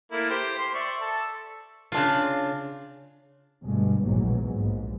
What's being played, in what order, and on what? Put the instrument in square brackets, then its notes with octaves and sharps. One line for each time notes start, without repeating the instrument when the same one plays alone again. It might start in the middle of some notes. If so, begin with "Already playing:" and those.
[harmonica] A3 A#3 E4
G4 C5
C6
D5 E5 C#6
A4
[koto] C#3 D4 F4
[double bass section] D2 G2 B2 G#3
A#1 D#2 G#2 B2 E3 F#3
A#1 G#2